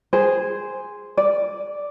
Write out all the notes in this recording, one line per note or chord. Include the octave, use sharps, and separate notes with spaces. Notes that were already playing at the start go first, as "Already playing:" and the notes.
G#4 C5
D5